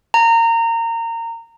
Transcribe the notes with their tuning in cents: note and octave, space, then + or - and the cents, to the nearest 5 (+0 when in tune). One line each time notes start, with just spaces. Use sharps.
A#5 -25